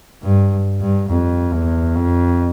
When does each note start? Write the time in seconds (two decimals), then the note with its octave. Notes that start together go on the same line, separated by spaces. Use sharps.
0.23 G2
0.81 G2
1.09 F2
1.52 E2
1.95 F2